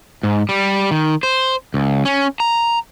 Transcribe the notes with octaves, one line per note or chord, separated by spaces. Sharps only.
G#2
G3
D#3
C5
C#2
C#4
A#5